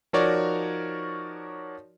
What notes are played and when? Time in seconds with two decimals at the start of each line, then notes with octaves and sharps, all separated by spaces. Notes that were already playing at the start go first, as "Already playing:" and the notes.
0.13 F3 D#4 F#4 A#4 C#5 D5